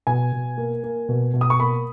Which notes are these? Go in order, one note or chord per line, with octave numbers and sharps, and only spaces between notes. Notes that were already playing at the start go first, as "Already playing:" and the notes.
B2 G#5
B2
A#3
A#3
B2
B2
D#6
C#6
A#3 B5